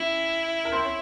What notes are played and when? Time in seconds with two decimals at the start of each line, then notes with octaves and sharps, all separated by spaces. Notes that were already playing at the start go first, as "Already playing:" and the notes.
Already playing: C#4 E4
0.65 A#4
0.72 C4 C5
0.84 C#5